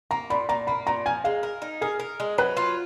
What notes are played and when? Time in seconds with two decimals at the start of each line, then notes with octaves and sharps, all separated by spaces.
0.11 A#3 A#5
0.30 A#2 B5
0.49 A#2 A#5
0.67 A#3 B5
0.87 A#2 A#5
1.06 F3 G#5
1.24 G#3 F5
1.43 A#4
1.62 D#4
1.81 G#4 A#4
2.00 A#4
2.20 G#3
2.38 F#3 B4
2.57 F4